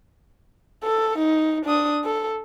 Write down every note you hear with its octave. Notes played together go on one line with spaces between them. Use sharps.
A4
D#4
D4 D#6
A4